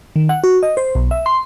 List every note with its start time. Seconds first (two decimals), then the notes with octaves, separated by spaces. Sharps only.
0.16 D#3
0.29 F#5
0.44 F#4
0.63 D#5
0.77 C5
0.95 B1
1.11 E5
1.26 C6